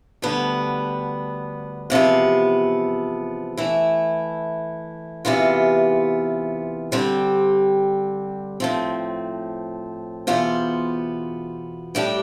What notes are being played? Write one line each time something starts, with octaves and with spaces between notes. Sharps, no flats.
D2 D3 G3 B3
E2 C3 F3 B3
E3 A3 E4
E2 C3 E3 B3 F4
D3 G3 C4 G4
A2 F3 C4
E2 B2 B3 F4 C5
A2 G3 D4 G4